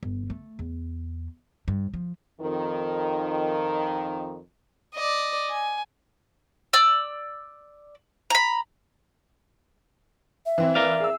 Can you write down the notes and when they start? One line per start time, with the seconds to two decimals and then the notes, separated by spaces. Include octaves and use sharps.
0.03 G1
0.30 A3
0.59 E2
1.68 G2
1.94 F3
2.41 F2 D#3
4.95 D5 D#5
5.50 G#5
6.73 D5 E6
8.30 A#5 B5
10.46 E5
10.58 E3 C4 E4
10.75 A#4 D5 F5
11.00 G#4 E6